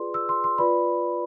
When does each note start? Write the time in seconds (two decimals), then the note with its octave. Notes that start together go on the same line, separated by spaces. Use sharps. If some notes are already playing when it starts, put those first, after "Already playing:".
Already playing: F4 G#4 B4 D5 C6
0.14 E6
0.29 C6
0.44 C6
0.58 F4 B4 D5 B5